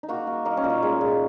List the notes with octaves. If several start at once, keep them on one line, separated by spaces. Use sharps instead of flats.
D#4
A#3 F#4
A#3
A#3 D#4
C#4
A#2
D#4
G#3
A#2